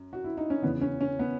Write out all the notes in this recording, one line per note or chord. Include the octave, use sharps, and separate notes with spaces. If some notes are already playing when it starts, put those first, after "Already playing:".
Already playing: F#2
F#4
E4
D#4
C#4
E2 C#3 E3 B3
C#4
C#4
B3